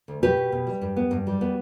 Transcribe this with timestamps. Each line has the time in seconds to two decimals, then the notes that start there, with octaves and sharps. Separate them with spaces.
0.08 D2
0.22 B2 G4 B4
0.37 B2
0.52 B2
0.67 G3
0.81 G2
0.96 B3
1.11 G2
1.27 G3
1.41 B3